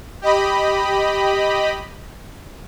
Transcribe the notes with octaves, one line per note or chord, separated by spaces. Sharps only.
G4 D#5 B5